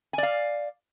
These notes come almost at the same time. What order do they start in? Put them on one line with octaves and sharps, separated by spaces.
G#5 D5 F5